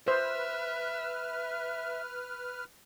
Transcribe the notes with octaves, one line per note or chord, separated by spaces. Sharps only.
B4 C5 E5 F6